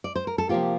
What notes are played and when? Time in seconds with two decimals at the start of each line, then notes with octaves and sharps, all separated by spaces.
0.04 D5
0.16 C5
0.27 A#4
0.38 A4
0.49 C3 F3 A#3 F4 G4